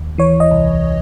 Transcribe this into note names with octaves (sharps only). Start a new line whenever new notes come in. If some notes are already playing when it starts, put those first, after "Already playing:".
Already playing: D#2
E3 C#5
D#5
C2